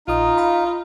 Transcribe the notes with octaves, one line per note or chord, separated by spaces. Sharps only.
A#1 D#4 F4 D#6
F5 A#5 B5